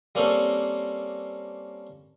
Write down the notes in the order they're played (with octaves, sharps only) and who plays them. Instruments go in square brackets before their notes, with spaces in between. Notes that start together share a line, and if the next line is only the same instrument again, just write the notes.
[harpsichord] G3 A#3 C4 C#4 A4